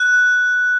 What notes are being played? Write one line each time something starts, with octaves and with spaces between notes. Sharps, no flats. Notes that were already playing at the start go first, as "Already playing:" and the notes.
Already playing: F#6